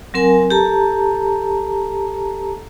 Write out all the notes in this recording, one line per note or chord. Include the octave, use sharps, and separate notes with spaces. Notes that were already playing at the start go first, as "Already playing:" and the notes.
F#3 C4 A#4 F#5 G#5
G4 A4 A5 A#5